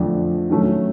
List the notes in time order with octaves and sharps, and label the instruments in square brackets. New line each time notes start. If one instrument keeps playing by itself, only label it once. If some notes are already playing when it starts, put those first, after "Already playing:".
Already playing: [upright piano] F2 D3 F3 A3 D4
D#3 F#3 A3 C#4